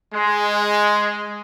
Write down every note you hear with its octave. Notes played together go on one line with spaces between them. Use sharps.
G#3